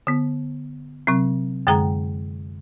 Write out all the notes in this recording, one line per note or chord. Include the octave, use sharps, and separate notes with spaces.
D3 B3
C3 F#3 C4
F#2 D3 G#3 G#4 G5 A#5